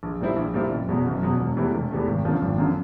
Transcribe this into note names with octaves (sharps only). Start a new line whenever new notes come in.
A#1
A#2 G3 C4 E4
A#1
A#2 G3 C4 E4
F#1
E2 B2 F#3
F#1
E2 B2 F#3
E1
E2 C3 E3 A3
E1
E2 C3 E3 A3
G#1
F#2 D3 F3
G#1
F#2 D3 F3